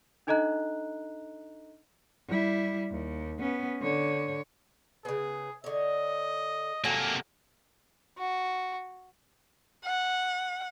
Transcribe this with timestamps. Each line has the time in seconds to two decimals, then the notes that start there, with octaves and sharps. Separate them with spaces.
0.27 D4 D#4 A4 D#5 A#5 F#6
2.28 G3 E4
2.91 D#2
3.39 B3 C#4
3.81 D3 C#5
5.05 C#3 B3 G#4
5.64 D3 C#5 D#5
6.84 C3 F#3 A3 A#3 G#5
8.18 F#4
9.85 F#5